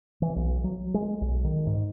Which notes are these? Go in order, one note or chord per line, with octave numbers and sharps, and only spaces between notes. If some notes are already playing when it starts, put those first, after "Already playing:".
E3
B1
F#3
G#3
B1
D#3
G#2